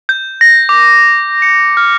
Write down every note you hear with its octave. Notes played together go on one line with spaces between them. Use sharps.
G6
A#6
D6
C#7
F6